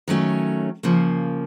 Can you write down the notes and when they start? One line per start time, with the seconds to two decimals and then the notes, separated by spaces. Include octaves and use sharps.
0.08 D#3 F#3 A3 C#4
0.83 C#3 F3 A#3